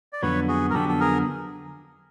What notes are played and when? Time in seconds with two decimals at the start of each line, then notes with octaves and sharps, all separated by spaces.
0.13 D5
0.22 F2 D3 F#3 B3 B4 C#5
0.48 F#4 G#4
0.70 A#4
0.74 F2 D3 F#3 B3 G4 A4
0.89 A4
1.00 G#4 A#4